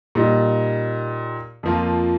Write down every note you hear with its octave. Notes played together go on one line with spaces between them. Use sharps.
A#2 G3 D#4
F2 F3 A#3 F4